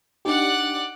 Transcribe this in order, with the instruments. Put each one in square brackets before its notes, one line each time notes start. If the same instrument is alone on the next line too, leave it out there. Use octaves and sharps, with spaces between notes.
[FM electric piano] D4 D#4 G4 [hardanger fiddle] D5 F#5